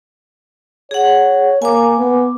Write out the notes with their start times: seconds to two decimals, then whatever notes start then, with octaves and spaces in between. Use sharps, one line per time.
0.91 G#4 C#5 F#5
1.62 A#3 G#5 D6
1.98 B3